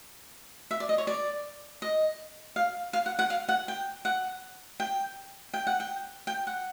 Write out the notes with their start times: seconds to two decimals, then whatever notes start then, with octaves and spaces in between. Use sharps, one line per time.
0.71 E5
0.80 D5
0.89 D#5
0.98 C#5
1.07 D5
1.82 D#5
2.56 F5
2.93 F5
3.06 F#5
3.19 F#5
3.30 F5
3.49 F#5
3.68 G5
4.05 F#5
4.80 G5
5.54 G5
5.67 F#5
5.80 G5
6.27 G5
6.47 F#5